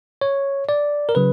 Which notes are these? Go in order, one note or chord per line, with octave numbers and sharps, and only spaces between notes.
C#5
D5
A#4
C#3 F#3 B4